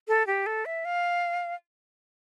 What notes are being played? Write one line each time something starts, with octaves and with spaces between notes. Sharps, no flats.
A4
G4
A4
E5
F5